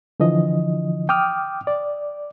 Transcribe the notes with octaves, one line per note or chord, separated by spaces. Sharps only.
D3 E3 F3 D#5
G5 D6 D#6 F6
D5